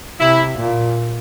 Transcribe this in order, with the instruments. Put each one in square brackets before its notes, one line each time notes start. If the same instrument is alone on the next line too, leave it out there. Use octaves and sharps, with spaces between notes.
[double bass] C3 [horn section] E4
[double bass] A#2